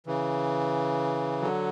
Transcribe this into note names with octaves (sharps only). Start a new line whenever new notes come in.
C#3 E3
D3 F#3